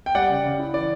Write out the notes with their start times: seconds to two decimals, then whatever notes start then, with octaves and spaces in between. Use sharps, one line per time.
0.06 G5
0.15 G3 D5 F#5
0.30 C#3
0.44 C#3
0.59 E4
0.74 E3 D5